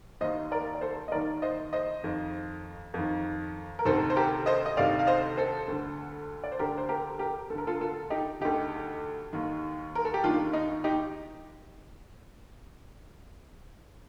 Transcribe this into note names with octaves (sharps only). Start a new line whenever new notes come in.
D#2 D#3 C5 D#5
A#4 D5
D5
A4 C5
D#5
D#2 D#3 A#4 D5
C5 D#5
C5 D#5
F2 D#3
F2 D#3
A#4
D2 C3 D#3 A4 C5
C5
G4 A#4
C5 D#5
D#5
D2 C3 D#3 D5 F5
F5
C5 D#5
A4 C5
D2 D3
D5
C5
D2 D3 G4 A#4
C5
G4 A#4
G4 A#4
D2 A4
D3 A#4
F4 A4
F4 A4
D#4 G4
D2 D3 D#4 G4
D#2 D#3
A#4
A4
G4
D#2 D#3 D4 F4
D#4
D#4 G4